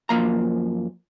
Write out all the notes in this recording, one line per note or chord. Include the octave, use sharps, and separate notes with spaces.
F#2 F3 A#3 A#5